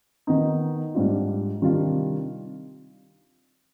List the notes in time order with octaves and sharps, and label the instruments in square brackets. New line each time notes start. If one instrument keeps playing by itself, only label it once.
[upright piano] D#3 B3 D#4
G#2 G3 D4 F4
C3 D#3 G3 D4 F4